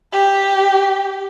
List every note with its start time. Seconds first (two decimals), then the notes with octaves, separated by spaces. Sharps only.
0.13 G4